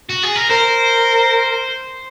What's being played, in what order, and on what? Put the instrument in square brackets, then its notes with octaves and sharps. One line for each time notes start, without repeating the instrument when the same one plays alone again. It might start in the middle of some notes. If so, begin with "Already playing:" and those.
[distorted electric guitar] F#4
G#4
A#4
[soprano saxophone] A#4 [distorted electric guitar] C5